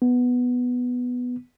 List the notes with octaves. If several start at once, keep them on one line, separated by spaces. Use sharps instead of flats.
B3